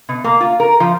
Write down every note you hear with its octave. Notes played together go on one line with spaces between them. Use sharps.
B2
A#3
F4
A#4
F3